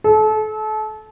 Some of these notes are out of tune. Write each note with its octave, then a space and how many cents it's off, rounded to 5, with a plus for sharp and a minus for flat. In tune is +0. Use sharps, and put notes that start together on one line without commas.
A4 -30